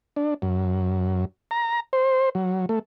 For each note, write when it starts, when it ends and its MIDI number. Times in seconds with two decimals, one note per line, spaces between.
0.16 0.34 62
0.42 1.25 42
1.51 1.80 82
1.93 2.29 72
2.35 2.66 54
2.69 2.79 57